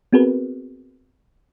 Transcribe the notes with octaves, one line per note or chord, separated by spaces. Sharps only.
B3 C4 F#4 G#4 A#4 B4